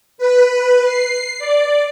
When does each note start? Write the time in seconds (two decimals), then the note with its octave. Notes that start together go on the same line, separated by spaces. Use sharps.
0.18 B4
0.85 C7
1.38 D5